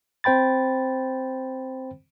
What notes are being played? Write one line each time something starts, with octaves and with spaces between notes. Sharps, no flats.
C4 C5 G5 B5 A6